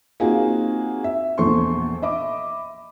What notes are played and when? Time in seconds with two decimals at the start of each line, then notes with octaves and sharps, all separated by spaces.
0.20 A#3 C4 D#4 F4 F#4 G#4
1.04 E5
1.38 A#1 E2 A4 C5 C6 C#6
2.02 D#5 E5 B5 D6